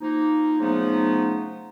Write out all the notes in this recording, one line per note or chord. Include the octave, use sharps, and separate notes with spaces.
F3 A#3 D#4
C#3 F3 F#3 A3 B3 D#4